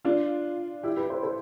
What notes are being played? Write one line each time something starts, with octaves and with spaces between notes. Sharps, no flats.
D4 F4
E4 G4
G4 B4
A4 C5
A4 C5